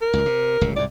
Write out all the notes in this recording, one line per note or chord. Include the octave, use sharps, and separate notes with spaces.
A#4
C#2 G2
C3
D1 C#2 C3
C2 G#2 D5